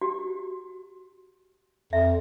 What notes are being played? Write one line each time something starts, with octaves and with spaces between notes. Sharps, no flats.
F#4 G4
F2 E5